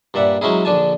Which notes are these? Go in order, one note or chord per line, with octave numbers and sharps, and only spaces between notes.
G2 A#2 D5 E5 F#5
F#3 G#3 C#4 D#4 E4 G#4
A#1 D3 D4 G#5 A5